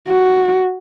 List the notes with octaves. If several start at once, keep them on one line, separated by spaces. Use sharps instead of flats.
F#4